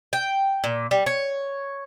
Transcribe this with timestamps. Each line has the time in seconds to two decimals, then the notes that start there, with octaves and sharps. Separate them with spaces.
0.13 G5
0.64 A#2
0.91 G3
1.06 C#5